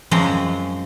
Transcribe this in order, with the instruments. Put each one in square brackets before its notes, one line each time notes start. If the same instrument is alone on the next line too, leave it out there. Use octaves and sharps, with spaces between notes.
[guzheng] F#2 F3 G#3 C4 A#5 C6